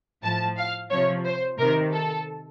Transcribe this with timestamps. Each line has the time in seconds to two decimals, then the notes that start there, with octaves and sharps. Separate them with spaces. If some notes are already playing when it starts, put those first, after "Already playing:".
0.23 A2 F3 A5
0.57 F5
0.91 C3 F3 C#5
1.25 C5
1.58 C3 D#3 A#4
1.93 A4